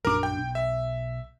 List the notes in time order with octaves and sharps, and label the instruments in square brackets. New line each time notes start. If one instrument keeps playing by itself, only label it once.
[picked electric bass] A#1 F#2 D4 [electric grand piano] A#4 D6
[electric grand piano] G5
[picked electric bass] B1
[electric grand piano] E5